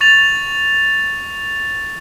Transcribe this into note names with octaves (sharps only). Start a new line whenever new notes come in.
C#6 A6 F7